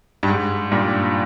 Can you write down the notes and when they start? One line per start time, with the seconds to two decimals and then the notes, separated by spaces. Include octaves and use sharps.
0.23 G2
0.28 G#2
0.72 G2 A#2